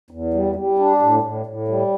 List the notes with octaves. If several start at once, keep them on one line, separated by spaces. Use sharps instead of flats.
E2
G3
G3
D4
A2
A2
A2
G3